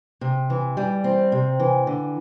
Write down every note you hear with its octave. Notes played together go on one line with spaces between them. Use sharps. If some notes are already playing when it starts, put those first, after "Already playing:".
C3
E3
G3
C4
C3
E3
D3